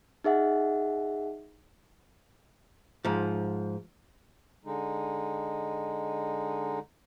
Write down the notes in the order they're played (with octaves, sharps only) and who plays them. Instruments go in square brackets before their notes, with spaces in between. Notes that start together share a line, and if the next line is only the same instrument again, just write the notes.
[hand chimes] D#4 G#4 E5 F#5
[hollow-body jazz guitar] G#2 F3
[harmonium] D3 G#3 D#4